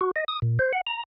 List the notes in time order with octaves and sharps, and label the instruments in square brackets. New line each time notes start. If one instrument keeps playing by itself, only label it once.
[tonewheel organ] F#4
D#5
D#6
A#2
C5
F#5
A#5